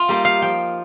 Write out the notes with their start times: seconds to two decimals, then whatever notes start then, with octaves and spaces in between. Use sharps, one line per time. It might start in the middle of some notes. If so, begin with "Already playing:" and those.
Already playing: F4
0.08 G3 A#3 D#4 G4
0.25 F5
0.42 F3 G5